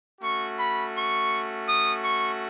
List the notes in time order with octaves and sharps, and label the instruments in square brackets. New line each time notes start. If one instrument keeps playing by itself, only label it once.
[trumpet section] A3 C#4 F#4 C#6
B5
C#6
D#6
C#6